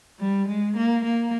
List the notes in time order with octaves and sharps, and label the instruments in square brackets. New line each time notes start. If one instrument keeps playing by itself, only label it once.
[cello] G3
G#3
A#3
A#3